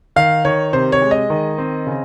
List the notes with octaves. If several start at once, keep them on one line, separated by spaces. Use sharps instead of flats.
D#3 F5
D#3 C#5
C3 C5
C#5
G#3
D#5
D#3
C4
C#3